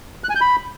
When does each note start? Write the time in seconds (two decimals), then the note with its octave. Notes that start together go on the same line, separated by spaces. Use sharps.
0.24 F#6
0.30 G#5
0.35 G6
0.41 B5